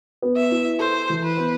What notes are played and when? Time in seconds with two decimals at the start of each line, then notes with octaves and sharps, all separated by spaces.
0.22 B3
0.36 E5
0.52 E4
0.80 A4 C5
1.10 E3
1.24 B4
1.37 B3